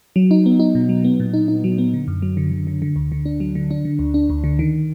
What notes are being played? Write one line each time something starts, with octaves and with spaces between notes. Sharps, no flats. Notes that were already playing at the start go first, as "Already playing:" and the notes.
F#3
D#4
B3
D#4
B2
F#3
B3
A#2
D#4
D#4
F#3
B3
D3
F#2
F#3
D3
D3
D3
D3
D2
D3
D4
F#3
D3
D4
D3
D2
D4
D2
D3
D#3